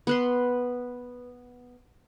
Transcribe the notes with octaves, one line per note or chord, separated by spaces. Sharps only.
B3 B4 C6